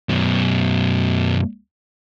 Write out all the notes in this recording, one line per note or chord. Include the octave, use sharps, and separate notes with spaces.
F#2 B2